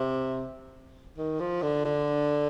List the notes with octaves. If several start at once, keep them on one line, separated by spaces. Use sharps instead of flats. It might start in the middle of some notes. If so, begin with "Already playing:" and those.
Already playing: C3
D#3
F3
D3
D3